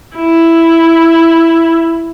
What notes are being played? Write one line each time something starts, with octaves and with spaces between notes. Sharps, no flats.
E4